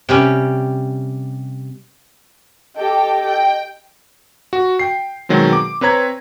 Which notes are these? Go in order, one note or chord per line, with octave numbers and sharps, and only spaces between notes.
C3 G3 C#4
G4 A4 D#5 G5
G5
F#4
G5 C7
B2 D#3 F#3 G#3 C4
D6
C4 B4 C#5 A#5 G#6